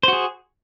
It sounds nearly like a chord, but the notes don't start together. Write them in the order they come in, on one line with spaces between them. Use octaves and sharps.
C5 F#4 G#4